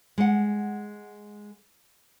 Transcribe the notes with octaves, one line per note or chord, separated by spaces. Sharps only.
G#3 F#5